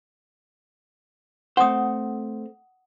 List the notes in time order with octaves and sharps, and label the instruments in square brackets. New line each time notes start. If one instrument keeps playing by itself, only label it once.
[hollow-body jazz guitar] A3 C4 C5 [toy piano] F#5 D#6